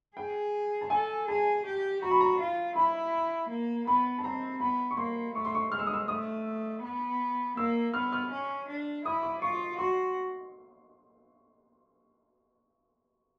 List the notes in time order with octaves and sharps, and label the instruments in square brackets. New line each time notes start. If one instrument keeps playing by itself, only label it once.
[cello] G#4 [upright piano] G5
[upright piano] A5
[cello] A4 [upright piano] G#5
[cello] G#4 [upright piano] A5
[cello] G4
[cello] F#4 [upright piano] A#5
[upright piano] B5
A#5
[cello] F4
[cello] E4 [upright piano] B5
[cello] A#3
[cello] B3 [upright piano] B5
[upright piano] A5
[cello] C4 [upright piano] A#5
[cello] B3 [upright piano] B5
[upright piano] C#6
[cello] A#3 [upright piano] C6
[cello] A3 [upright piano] C#6
[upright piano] C6
C#6
[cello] G#3 [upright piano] F6
[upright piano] E6
D#6
E6
[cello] A3 [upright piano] D#6
[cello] B3
[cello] A#3 [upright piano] E6
[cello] B3 [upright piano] F6
[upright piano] F6
[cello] C#4
D4
[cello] E4 [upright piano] D#6
[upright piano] D6
[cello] F4 [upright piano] C#6
[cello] F#4 [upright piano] C6